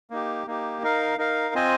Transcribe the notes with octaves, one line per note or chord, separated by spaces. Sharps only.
A#3 D#4 G4
A#3 D#4 G4
D#4 A#4 F5
D#4 A#4 F5
C4 F4 C5 D#5 G#5